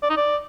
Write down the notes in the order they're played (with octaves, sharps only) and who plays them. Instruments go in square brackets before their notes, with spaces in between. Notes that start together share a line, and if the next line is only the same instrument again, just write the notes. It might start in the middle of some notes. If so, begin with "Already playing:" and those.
[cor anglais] D5
D#4
D5